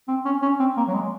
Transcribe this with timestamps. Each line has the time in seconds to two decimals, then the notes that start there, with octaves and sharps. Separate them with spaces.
0.08 C4
0.25 C#4
0.42 C#4
0.59 C4
0.77 A#3
0.88 F#3
0.94 G#3